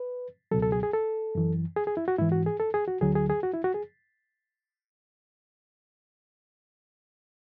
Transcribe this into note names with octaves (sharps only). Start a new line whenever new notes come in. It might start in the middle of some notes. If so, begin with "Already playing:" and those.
Already playing: B4
C#2 B2 F#3 A4
A4
G#4
G#4
A4
F#2 E3
G#4
G#4
E4
F#4
G#2 E3 E4
F#4
G#4
A4
G#4
F#4
D2 D3 F#3 G#4
G#4
G#4
F#4
E4
F#4
G#4